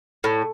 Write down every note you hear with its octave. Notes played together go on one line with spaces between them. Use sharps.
A2